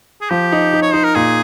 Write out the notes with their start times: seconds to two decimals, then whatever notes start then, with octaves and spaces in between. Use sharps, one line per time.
0.21 G#4
0.30 F3 G4
0.52 D#4
0.73 D#4
0.82 C#5
0.93 D#4 C5
1.04 A#4
1.15 A#2 G#4